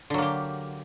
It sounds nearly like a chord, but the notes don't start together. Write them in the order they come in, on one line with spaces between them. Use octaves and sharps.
D3 F#3 A#3 G4